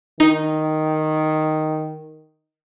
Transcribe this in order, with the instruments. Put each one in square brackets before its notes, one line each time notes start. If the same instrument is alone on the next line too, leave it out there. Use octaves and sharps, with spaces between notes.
[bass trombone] D#3 [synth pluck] D#4